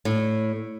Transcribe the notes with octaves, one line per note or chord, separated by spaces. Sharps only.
A2